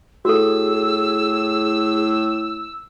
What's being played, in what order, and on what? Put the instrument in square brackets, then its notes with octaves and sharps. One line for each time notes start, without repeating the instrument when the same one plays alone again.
[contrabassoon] A2 [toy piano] F#4 A4 [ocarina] G#4 [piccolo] E6